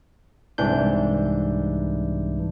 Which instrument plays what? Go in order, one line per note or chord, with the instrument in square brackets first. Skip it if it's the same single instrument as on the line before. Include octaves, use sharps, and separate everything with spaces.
[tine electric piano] C2 G#2 E3 D4 G6